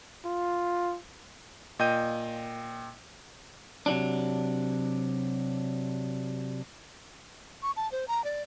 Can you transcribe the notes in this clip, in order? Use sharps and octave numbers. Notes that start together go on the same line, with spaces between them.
F4
A#2 D#5 G5 G6 D#7
C3 F#3 D4
C#6
A5
C5
A#5
D5